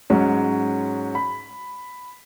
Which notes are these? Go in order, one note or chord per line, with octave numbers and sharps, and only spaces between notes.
G#2 F#3 G#3 C#4
B5